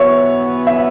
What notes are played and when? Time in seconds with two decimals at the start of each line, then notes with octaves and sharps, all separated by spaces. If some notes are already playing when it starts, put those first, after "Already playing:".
Already playing: E3 B3 F#4 B4 C#5 E5
0.67 E5